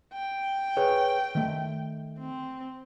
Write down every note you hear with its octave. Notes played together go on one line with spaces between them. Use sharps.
G5
G#4 B4 C#5
D#3 A3
C4